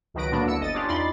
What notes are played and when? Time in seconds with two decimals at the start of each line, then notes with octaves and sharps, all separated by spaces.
0.14 C#2 D#3 F#3 B4 A#6 D7
0.31 A#2 D3 F#3 A#3 B3 D4
0.46 D2 E4 E6 C#7
0.60 G1 D#5 D#6 A6
0.74 C#4 D4 F4 G4
0.88 E2 D#4 D5 B5 C6 A6